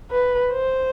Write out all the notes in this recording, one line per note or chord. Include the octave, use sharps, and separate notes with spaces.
B4
C5